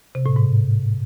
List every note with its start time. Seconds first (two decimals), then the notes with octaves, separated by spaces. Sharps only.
0.15 C3
0.26 A2
0.36 G#2